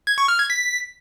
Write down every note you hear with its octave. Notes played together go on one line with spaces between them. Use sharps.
G#6
C#6
F6
G#6
B6